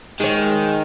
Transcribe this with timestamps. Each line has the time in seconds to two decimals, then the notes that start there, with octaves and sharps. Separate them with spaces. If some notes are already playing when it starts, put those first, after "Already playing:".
0.20 D#3 G#3 C#5